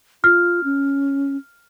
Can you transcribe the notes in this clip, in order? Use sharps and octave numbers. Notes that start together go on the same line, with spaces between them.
F4 F6
C#4